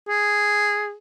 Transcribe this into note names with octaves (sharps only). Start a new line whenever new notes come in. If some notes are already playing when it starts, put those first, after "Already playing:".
G#4